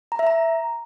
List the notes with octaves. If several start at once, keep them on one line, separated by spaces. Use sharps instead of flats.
A#5
E5
A#5